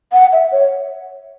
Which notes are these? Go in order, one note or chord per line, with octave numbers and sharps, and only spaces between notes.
F#5
E5
C#5